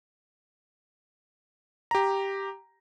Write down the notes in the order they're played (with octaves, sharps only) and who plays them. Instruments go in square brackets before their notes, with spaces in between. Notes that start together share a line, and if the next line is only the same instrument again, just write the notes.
[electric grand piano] G4 A#5